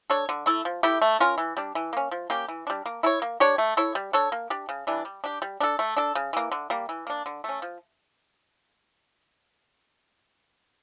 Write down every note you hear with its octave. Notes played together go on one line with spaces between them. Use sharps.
D4 A4 C#5
D3
A3 E4 A4
F3
A3 E4 G4
A3
C#4 F4 A#4
E3
G3 D4
E3
A#3 C#4
F3
A#3 C#4 G4
E3
G3 D4
A#3
E4 A4 C#5
A#3
D4 G4 C#5
A3
E4 A4 C#5
G3
D4 A4 C#5
A#3
D4 G4
C#3
E3 G3 D4
G3
D4 G4
G3
D4 A4
A3
D4 A4
C#3
E3 A#3
D3
G3 A#3
E3
A#3 D4
D3
A3 C#4
F3